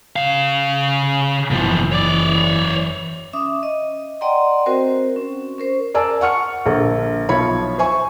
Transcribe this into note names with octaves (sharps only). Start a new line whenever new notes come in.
C#3 F5
F#1 B2 E3 F3
C#5 D5
C#4 E5 D6 D#6
D#5
D5 D#5 F#5 G5 A#5 C6
C4 F#4 A#4 C5
C#4
C#4 A#4 C5
A#4 D5 G#5 A5 E6
F#5 C#6 F6 C#7
A#1 D3 A4 A#4
B1 F3 C#5 E5 B5
C5 E5 G#5 C#6